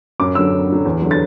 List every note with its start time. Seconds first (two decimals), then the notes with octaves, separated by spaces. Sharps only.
0.20 F#2 D6
0.35 D3 F#3 E6
0.52 F#2
0.69 D3 F#3
0.85 E2
1.02 D3 F#3
1.11 A6